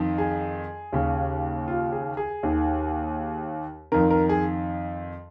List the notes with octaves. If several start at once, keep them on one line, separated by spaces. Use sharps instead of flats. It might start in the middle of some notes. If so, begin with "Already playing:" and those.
Already playing: F2 D#3
G#4
D#2 C#3
F4
G#4
G#4
D#2 D#3
F2 D#3 A#4
A#4
G#4